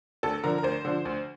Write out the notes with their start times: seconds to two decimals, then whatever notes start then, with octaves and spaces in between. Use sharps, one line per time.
0.23 D2 A4
0.43 D3 F3 A#4
0.58 A#4
0.63 D2 C5
0.85 D3 F3
1.05 D2